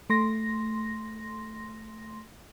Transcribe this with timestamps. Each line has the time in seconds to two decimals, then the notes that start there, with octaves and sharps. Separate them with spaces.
0.10 A3 C6 A#6